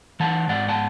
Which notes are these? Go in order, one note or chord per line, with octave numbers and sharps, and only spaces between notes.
E3 F#5 A5
G#2 D5 F#5
F#5 A5